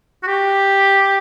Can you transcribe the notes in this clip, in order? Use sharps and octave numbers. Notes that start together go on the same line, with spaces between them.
F#4
G4